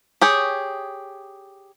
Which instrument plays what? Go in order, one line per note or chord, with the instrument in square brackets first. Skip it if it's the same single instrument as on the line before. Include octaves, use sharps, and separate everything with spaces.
[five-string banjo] G4 G#4 C#5